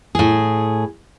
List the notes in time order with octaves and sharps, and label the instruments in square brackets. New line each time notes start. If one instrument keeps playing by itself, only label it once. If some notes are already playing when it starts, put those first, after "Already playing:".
[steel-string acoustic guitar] A2 G#4